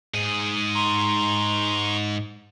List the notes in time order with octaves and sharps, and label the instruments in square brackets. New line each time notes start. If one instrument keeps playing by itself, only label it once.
[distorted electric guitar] G#2 G#4
[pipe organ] A#5 C6 C#6